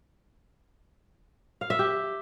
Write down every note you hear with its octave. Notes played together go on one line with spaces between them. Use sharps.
F5
E5
G4